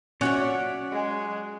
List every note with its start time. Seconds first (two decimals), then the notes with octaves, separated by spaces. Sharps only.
0.21 F#3 C#4 F#4 C#5 D5 E5 F#5
0.91 G#3